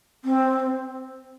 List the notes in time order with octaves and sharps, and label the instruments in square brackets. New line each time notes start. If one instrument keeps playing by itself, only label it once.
[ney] C4